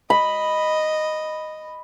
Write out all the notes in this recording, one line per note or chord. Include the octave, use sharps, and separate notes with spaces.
D#5 B5